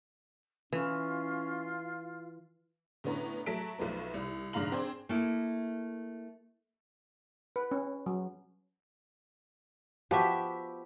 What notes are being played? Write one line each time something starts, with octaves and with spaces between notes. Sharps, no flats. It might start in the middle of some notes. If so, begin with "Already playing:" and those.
E3 C#4 F4
A2 D3 B3 C#4 A#5
F#3 A3 A5 B6 D7
B1 F3 A3 B3
C2
F1 G#2 D3 F5 A#5 F#7
C4 D4 G#4 C5
A3 A#3 E4
B4
C#4
F#3
F3 B3 F#4 G4 E5